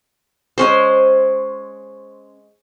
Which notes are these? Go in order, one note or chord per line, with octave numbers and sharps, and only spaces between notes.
G#3 C#4 C5